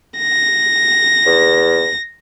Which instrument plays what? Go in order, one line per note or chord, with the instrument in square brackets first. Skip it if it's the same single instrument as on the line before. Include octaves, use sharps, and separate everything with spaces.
[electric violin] A#6
[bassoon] E2